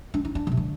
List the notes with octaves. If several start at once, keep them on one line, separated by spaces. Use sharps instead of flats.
D4
D#4
D4
D#3
C3
D3